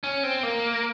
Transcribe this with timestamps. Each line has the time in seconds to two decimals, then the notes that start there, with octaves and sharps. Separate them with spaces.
0.04 C#4
0.23 C4
0.43 A#3